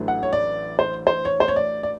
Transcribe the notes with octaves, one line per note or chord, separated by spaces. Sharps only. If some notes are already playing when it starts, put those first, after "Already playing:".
Already playing: A1 A2 F#3 A3 D4
F#5
C#5
D5
C5
C5
C#5
C5
C#5
D5
D5